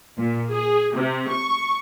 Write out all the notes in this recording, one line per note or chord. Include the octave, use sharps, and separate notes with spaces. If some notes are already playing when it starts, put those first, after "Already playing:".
A#2
G#4
C3
C#6